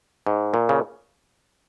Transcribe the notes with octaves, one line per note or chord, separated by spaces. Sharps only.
G#2
A#2
C#3